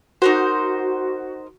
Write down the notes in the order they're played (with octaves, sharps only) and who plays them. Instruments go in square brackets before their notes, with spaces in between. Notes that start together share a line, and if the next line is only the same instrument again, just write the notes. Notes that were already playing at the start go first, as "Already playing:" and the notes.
[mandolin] D#4 A#4 C5 [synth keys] F#4